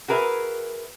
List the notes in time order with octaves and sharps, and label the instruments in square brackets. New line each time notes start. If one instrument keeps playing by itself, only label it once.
[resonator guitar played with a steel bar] F#4 G#4 A#4 B4 E5